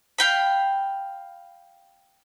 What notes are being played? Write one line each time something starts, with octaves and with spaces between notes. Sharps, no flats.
F5 G5 B5